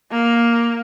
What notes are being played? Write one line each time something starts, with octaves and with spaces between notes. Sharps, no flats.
A#3